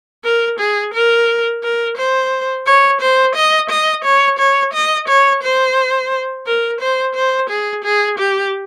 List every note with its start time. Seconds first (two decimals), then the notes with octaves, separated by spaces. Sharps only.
0.24 A#4
0.59 G#4
0.94 A#4
1.63 A#4
1.97 C5
2.66 C#5
3.01 C5
3.36 D#5
3.70 D#5
4.04 C#5
4.39 C#5
4.73 D#5
5.08 C#5
5.43 C5
6.46 A#4
6.80 C5
7.15 C5
7.49 G#4
7.84 G#4
8.19 G4